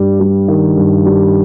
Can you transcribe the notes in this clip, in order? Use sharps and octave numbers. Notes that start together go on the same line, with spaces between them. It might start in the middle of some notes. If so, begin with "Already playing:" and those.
Already playing: G2 G3
G3
D#3
G2
G3